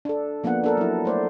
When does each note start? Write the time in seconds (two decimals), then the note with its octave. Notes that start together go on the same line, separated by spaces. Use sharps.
0.05 D4 A4
0.44 F3 A#3 B3 D4 F#5
0.64 D4 A4 A#4
0.77 F#3 E4
1.05 A3 C5 D5